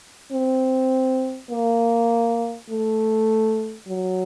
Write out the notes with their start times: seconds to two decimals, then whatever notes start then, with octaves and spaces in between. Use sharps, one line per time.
0.32 C4
1.51 A#3
2.70 A3
3.88 F#3